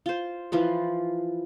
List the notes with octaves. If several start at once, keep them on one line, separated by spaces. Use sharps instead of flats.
F4 C5
E3 F3 F4 B4